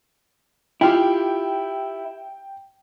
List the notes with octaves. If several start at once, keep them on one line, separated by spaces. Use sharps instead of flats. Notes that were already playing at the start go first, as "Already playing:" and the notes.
E4 F4 G4 G5